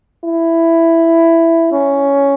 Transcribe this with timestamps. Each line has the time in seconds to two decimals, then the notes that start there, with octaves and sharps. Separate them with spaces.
0.25 E4
1.72 C#4